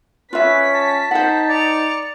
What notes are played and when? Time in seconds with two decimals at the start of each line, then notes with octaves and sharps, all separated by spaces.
0.33 C#4 F4 B4 E5 B6
0.74 A5
1.11 D#4 C5 F#5 A5
1.49 D5 C#7 F7